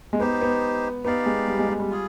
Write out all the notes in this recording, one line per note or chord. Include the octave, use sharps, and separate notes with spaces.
G#3
B3 D#4 G4 C5
B3
B3 D#4 G4 D5 F5
G#3
G3
G#3
G#3
G3
F4 G#4